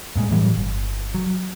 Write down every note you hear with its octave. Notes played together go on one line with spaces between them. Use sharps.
G2 A#2 G#3
A2 E3 F#3 G3
G1
F#3